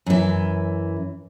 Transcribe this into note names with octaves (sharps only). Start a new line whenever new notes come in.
F#2 E3